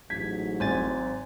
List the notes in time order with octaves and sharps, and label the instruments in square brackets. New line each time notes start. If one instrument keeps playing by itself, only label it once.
[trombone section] A1 G#2 F#3 [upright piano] G#6 B6
[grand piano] G#1 [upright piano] F#2 [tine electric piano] C5 G#5 A6